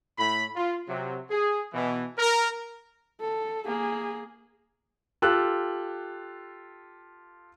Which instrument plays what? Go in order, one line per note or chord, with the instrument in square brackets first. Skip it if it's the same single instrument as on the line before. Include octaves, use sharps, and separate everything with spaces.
[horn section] A2 B5
F4
C3 F#3
G#4
B2 E3
A#4
[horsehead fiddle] A4
A#3 G#4
[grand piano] F4 G4 A4 E6 F#6